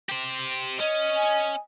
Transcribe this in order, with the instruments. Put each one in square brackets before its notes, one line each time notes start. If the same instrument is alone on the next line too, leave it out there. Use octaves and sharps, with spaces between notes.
[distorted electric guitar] G4 C5
[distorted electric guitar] C#4 [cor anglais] D#5
[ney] G#5